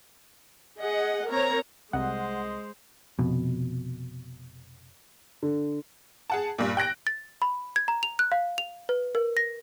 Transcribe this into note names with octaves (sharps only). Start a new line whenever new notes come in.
G#4 D#5 F#5
C4 A#4 C#5 A#5
C2 G#3 C5 D#5 F#5
F1 F2 B2
D3
G#4 F#5 A5
G2 A#2
G5 F#6 A#6 D7
A6
B5
G#6
A#5
F7
F#6
F5
F7
B4
A#4
A#6